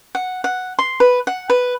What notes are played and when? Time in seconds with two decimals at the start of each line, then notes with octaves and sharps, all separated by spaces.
0.15 F#5
0.44 F#5
0.79 C6
1.00 B4
1.27 F#5
1.50 B4